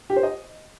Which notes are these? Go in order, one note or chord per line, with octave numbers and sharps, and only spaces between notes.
G4
C5
D#5